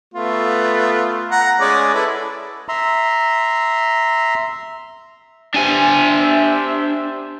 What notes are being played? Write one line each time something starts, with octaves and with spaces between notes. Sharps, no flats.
A3 B3 F4
F#5 A#5
G#3 C#4 D5
E4 A4 B4
E5 A#5 C6
D4 G4 C5 E5 G#5